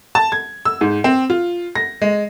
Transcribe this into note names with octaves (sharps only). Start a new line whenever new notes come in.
A5
G#6
E6
G#2
C4
F4
A#6
G#3